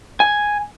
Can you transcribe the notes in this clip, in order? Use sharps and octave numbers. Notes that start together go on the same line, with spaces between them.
G#5